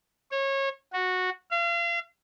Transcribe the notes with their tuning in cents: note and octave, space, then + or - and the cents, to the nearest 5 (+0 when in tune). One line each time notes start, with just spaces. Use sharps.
C#5 -25
F#4 -10
F5 -35